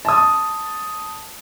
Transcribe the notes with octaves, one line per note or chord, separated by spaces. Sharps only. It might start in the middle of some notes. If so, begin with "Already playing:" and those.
A5 D#6